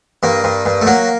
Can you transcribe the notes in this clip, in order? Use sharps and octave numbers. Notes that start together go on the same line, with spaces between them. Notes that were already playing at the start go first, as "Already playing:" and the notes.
G2 A#3
G2
G2
A3
F#3 A#3